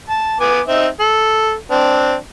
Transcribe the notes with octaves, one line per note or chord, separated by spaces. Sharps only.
A5
B3 G#5 D6
C4 D#4 E5
A4
C4 D4